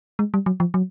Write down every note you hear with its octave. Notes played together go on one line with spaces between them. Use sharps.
G#3
G3
F#3
F3
F#3